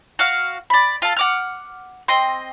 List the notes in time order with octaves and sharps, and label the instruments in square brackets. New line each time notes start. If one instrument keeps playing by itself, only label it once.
[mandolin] F#4 F5
D5 B5
F4 A4
F#5 D6 F6
C4 D#5 C6